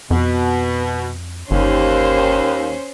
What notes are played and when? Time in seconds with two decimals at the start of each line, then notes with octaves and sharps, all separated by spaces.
0.11 F2 B2
1.51 G1 D#2 C#4 C5